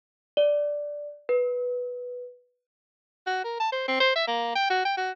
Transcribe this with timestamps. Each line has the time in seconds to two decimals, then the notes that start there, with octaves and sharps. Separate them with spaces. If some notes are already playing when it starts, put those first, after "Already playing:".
0.37 D5
1.29 B4
3.27 F#4
3.44 A#4
3.60 A5
3.72 C5
3.88 C4
4.00 C5
4.15 E5
4.27 A#3
4.55 G5
4.70 F#4
4.85 G5
4.97 F#4